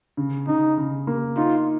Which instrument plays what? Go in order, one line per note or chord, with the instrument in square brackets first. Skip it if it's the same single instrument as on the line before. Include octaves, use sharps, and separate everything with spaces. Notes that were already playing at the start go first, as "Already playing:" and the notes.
[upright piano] C#3
[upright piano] C#3 [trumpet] D#4
[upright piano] C#3
A#3
[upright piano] D#4 [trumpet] F4